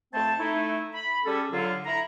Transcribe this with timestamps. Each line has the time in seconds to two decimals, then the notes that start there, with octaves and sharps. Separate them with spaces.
0.13 F2 A3 C4 C5 A5
0.39 A3 D#4 E4
0.93 B5
1.25 G3 C#4 G#4 A4
1.51 D3 F#3 F4
1.85 E4 A#5